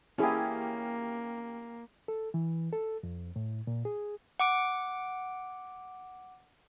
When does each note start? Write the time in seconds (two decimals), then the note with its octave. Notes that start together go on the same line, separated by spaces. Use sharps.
0.18 A#3 C#4 E4 G4 G#4
2.08 A4
2.34 E3
2.73 A4
3.03 F2
3.36 A2
3.67 A#2
3.85 G#4
4.40 F#5 D6 D7